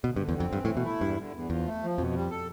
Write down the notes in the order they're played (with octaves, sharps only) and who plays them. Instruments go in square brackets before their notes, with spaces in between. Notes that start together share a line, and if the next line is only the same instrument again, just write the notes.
[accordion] D2 [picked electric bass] B2
[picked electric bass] G2
[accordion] D3
[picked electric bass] E2
[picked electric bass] F2 [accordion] C4
[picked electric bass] G2 [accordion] E3
[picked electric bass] A2
[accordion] A3
[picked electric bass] B2
[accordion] E4
[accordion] E2 [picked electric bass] G2
[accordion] D3
E2
[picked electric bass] E2 [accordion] F3
[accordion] A3
F3
[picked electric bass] F2 [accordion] B2
[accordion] G3
A4